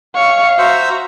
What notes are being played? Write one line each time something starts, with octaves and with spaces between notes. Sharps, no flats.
C#5 F5 C#7
F#4 C5 E5 A#5 E6